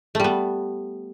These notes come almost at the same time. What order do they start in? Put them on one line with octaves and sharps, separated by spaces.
A3 G3 B3